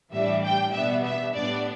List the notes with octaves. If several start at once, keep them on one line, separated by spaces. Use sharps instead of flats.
A2 E3 G3 D4 E5
G5
B2 G3 B3 D4 E5
E5
A2 G3 B3 D4 D5